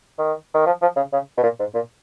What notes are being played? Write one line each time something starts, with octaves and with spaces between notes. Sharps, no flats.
D#3
D#3
F3
F3
C#3
C#3
B2
A#2
G#2
A#2